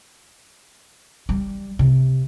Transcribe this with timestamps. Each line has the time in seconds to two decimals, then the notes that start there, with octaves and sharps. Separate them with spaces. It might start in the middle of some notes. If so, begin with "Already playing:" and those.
1.29 G3
1.79 C3